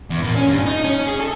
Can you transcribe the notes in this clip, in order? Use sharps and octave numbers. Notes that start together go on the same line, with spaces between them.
E2
A#2
C#4
G2
D#4
C#4
G#4
A4